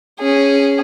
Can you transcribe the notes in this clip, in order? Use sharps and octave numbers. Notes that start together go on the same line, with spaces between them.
C#4 G#4